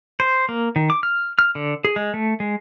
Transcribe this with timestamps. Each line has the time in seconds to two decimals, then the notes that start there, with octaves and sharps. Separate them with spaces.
0.20 C5
0.49 A#3
0.76 D#3
0.90 D6
1.03 F6
1.39 F6
1.55 D3
1.85 G#4
1.96 G#3
2.14 A3
2.40 G#3